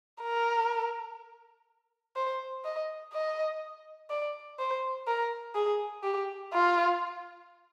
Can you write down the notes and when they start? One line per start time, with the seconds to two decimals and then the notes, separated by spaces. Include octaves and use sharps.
0.22 A#4
2.16 C5
2.64 D#5
3.13 D#5
4.10 D5
4.59 C5
5.07 A#4
5.55 G#4
6.03 G4
6.53 F4